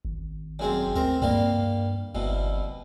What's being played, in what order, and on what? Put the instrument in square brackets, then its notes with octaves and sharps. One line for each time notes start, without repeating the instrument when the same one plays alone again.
[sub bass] G#1
[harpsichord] F#2 G#3 C4
[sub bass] D2 [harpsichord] C4 A#4
[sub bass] G2 [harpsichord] G3 A#3 F5
[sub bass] G1 [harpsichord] C2 B2